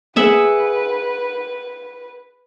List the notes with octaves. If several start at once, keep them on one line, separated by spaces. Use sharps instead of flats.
G#4 B4 E5 F#5